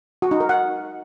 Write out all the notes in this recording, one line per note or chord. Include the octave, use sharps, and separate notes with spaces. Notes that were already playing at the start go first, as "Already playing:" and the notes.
F#4
D#4
A#4
F#5